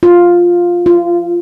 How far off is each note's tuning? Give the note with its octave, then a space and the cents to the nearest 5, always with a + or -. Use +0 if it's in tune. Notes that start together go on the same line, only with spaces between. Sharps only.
F4 +5
F4 -20